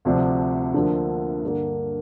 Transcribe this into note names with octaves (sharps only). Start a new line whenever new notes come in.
D2 C3 F3 D4
D2 D3 F3 A#3
G2 D3 A#3